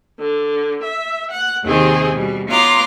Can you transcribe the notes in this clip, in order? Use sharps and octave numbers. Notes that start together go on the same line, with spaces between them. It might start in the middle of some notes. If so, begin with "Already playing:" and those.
D3
E5
F#5
D#2 C3 D#3 C4 G#4
B2 G3
B3 F4 C#5 A#5 C6 D6